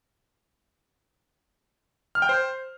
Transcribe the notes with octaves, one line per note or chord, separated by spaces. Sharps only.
F6
G5
C5